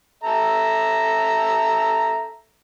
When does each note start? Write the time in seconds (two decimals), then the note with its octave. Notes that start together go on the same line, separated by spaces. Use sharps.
0.23 A4 E5 A#5